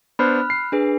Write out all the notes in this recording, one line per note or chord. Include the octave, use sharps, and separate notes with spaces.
B3 D4 C5 B5 F6 F#6
C7
D4 G#4 B4